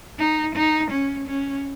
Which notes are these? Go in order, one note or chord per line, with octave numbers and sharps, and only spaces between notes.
D#4
D#4
C#4
C#4